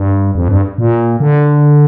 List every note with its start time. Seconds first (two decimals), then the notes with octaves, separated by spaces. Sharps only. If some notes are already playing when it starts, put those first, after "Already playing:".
Already playing: G2
0.35 F2
0.49 G2
0.78 A#2
1.20 D3